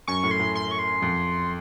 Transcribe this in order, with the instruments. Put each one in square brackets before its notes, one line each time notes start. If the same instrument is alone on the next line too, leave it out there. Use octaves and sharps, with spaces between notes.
[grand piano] F#2 [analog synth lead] C#6
[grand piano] A2
[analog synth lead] C6
[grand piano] A2
[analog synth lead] C6
C#6
C6
[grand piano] F2